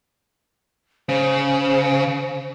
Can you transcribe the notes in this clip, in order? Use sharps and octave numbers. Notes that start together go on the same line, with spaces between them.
C#3 C5